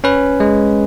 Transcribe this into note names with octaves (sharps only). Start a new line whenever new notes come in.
C#4 B4
G#3